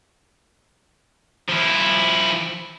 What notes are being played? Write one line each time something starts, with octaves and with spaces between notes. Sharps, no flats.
F3 E4